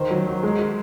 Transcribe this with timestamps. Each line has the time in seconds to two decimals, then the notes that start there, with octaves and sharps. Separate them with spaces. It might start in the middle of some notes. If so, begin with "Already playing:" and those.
Already playing: D#3 C5
0.11 F#3
0.27 F#3
0.43 G#3